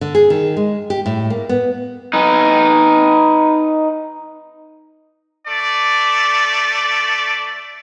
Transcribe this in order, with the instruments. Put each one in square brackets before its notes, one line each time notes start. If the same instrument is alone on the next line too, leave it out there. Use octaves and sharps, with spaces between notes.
[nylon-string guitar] D3
G#4
D#3
G#3
G4
A2
A#3
B3
[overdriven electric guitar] D#4 B4
[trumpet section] A3 D5